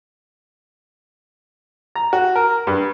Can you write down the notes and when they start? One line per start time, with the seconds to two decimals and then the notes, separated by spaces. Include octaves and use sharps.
1.95 A#5
2.13 F#4
2.36 A#4
2.67 G2